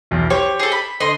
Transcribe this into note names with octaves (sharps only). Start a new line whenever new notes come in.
B1 E2
G4 C5 C#5
G#4 A4
B5
D3 D#5 C6